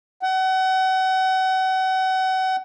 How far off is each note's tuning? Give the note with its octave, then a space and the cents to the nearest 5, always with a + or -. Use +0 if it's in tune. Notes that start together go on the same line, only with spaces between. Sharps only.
F#5 +35